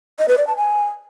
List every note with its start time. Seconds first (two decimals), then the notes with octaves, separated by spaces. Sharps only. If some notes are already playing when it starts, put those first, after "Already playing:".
0.19 D#5
0.28 B4
0.38 D5
0.47 A5
0.56 G#5